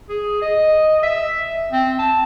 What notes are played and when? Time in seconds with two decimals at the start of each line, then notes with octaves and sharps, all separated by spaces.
0.09 G#4
0.42 D#5
1.03 E5
1.72 C4
1.99 A5